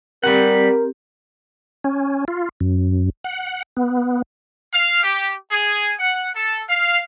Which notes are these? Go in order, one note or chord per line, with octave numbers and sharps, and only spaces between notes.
G3 C4 G4 A#4 F#5
C#4
F4
F#2
F#5
B3
F5
G4
G#4
F#5
A4
F5